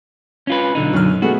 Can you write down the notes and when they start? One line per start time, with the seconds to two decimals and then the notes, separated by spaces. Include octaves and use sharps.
0.47 C#4 F4 B4
0.75 B1 D3 D#4
0.93 F#2 F6
1.22 A3 B3 F#4 G#4